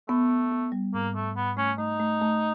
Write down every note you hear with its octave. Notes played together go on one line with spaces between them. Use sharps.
A3 B3
B3
B3
G3
G#2 A#3
G#2 A3
G#2 B3
A3 C#4
A3 D#4
A3
A3